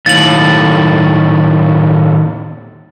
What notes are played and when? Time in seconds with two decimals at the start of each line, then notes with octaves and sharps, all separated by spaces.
0.06 D#2 A2 A6 F#7